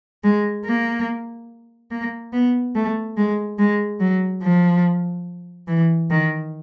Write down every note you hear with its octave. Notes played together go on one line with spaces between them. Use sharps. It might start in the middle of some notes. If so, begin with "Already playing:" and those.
G#3
A#3
A#3
B3
A3
G#3
G#3
F#3
F3
E3
D#3